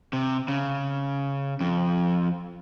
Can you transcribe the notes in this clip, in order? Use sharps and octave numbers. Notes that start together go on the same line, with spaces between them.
C3
C#3
F2